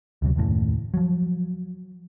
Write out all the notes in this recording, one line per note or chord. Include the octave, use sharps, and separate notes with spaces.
D2 C3 F#3
F#1 D#2 A2 C#3
F3 F#3